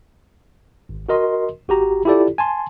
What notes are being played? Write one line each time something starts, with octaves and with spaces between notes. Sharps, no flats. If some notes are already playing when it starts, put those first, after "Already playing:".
G#1
F#4 A#4 D#5 C6
G#1 F#4 G4 A#5
E4 F4 G4 A4 D5
G#5 A5 C6